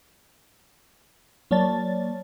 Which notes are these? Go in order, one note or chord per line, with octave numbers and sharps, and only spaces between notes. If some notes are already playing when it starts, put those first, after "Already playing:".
F#3 A#3 C#5 D5 A5 A6